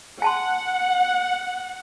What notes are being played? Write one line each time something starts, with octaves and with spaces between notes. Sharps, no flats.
F#5 G#5 A5 C6